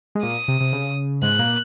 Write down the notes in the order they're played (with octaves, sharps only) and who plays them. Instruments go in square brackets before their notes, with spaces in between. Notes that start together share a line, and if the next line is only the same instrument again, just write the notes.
[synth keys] G#3
[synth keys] A#2 A#3 [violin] D#6
[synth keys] C3
C3
C#3
[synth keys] G#2 G#3 [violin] F#6
[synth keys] A#2 A#3